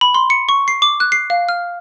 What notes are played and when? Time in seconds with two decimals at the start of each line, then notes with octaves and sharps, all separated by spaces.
0.01 B5
0.14 C6
0.30 C#7
0.49 C#6
0.68 C7
0.82 D6
1.00 F#6
1.12 C7
1.30 F5
1.49 F6